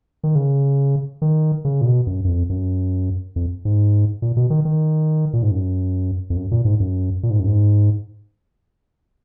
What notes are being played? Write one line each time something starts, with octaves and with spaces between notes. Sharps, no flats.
D#3
C#3
D#3
C#3
A#2
B2
F#2
F#2
F2
F#2
F2
G#2
A#2
B2
D#3
D#3
A#2
G#2
F#2
F2
F#2
A#2
G#2
F#2
A#2
G#2
F#2
G#2